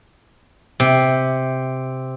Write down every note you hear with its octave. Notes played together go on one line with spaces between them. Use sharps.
C3